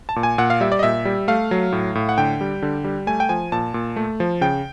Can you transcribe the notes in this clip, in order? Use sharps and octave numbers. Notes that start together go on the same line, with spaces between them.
A5
A#2
G#5
A#2 F#5
F5
G3 E5
D5
D#5
A#2 E5
G3
A3 F5
F#3
A2
A2
F#5
D3 G5
G3
D3
G3
A3 G#5
G5
F3 G#5
A#2 A5
A#2
A3
F3
C#3 G5